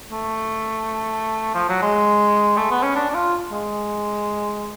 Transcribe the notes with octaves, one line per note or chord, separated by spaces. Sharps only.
A3
F3
F#3
G#3
A3
B3
C#4
D4
D4
F4
G#3